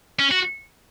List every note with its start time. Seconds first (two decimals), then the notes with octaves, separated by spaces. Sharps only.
0.19 C#4
0.31 F#4